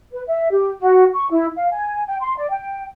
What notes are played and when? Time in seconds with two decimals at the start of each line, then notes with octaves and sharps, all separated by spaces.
0.12 B4
0.28 E5
0.51 G4
0.81 F#4
1.14 C#6
1.31 E4
1.56 F5
1.71 G#5
2.07 G5
2.21 C6
2.38 D5
2.50 G5